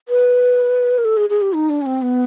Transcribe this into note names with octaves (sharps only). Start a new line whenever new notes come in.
B4
A#4
A4
G#4
G#4
G4
D#4
D4
C#4
C4
B3